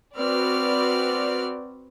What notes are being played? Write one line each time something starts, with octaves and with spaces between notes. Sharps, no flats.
C4 F#4 B4 D5 F6